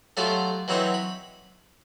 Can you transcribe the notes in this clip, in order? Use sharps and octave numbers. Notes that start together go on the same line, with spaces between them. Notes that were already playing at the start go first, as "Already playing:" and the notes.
F#3 A3 F4 G4 C5 D5
E3 F#3 C4 D#4 B4 C#5
B5